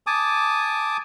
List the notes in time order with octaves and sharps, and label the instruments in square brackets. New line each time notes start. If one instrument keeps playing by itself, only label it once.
[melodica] G#5 A5 D6 D#6